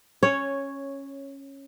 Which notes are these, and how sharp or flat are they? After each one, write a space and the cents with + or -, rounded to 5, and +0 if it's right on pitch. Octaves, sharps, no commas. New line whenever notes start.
C#4 -10 C#5 +0